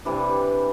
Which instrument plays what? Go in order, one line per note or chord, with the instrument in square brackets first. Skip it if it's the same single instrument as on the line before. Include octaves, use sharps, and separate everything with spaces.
[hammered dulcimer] C3 E3 G3 D4